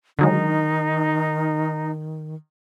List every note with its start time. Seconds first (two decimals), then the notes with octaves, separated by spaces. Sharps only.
0.19 D3 D#3 F#3 G#3 D#4